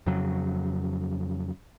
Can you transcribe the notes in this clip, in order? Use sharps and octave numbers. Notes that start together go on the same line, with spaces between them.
F2 C#3 F#3